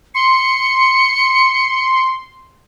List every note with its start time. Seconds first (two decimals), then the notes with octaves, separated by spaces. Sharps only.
0.15 C6 C#7